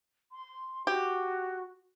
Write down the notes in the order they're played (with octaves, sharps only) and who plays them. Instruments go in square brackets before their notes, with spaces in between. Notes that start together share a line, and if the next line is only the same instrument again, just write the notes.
[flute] C6
[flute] F#4 [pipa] G4